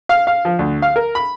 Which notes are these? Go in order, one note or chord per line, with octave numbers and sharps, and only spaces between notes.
F5
F5
F3
D2
F5
A#4
B5